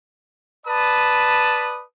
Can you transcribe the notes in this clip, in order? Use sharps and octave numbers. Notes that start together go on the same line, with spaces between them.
B4 D5 A5 B5 D#6